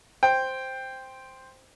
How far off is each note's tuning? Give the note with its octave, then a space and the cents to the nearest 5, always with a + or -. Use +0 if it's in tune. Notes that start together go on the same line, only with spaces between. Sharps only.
C5 +0 G5 +5